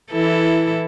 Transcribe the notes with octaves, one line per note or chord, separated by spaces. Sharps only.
E3 E4 A4